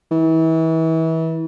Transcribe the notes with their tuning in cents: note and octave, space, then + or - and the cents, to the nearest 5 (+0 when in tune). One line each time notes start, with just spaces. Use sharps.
E3 -30